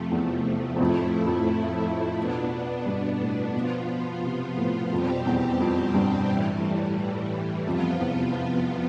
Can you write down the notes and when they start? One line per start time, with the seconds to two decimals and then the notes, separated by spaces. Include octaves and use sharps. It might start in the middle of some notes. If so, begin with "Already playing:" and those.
Already playing: F2 C3 F3 A3
0.11 E2
0.76 E2
0.80 F2 A2 F3 A3 E4
1.26 F2
2.18 B2 B3 D4
2.86 G2
3.21 A2
3.54 B2 F3 B3 F4
4.24 C3
4.57 A2
4.92 F2 B2 G3 C4 G4
5.26 E2
5.60 F2
5.94 G2
6.29 A2 E3 G3
7.66 F2 C3 F3 B3 F4
8.00 E2